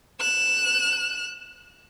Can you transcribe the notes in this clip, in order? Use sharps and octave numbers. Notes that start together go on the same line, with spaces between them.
F#6 E7